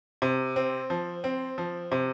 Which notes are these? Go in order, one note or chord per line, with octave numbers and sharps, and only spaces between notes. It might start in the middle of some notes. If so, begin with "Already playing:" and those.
C3
C4
F3
C4
F3
C3